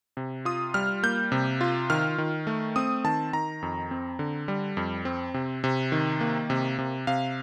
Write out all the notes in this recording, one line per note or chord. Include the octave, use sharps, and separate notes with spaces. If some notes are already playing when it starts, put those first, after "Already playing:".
C3
F4 D#6
G3 F6
A#3 G6
C3
F4
D#3 F6
D#3
A3
C4 D#6
D#3 A5
D#3 A#5
F2
C4
D3
G3
F2
C4
C3
C3
D#3
A#3
C3
C3
C3 F5